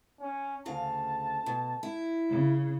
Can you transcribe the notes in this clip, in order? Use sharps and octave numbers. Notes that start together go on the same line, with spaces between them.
C#4
D2 C#3 F5 A5
B2
E4
C#3